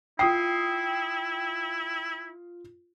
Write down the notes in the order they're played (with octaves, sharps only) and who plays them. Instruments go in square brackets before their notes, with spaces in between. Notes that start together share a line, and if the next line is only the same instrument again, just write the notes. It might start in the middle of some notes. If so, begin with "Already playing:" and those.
[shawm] E4 [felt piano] F4 D#6 C7 [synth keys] G5